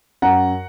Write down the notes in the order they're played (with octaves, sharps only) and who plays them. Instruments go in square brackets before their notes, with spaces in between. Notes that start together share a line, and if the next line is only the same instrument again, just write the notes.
[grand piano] F#2 F#5 A#5